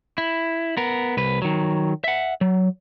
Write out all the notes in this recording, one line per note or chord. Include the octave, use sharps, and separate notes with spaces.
E4
B3 A#4
C2 B4
D#3 F#3
E5 F#5
F#3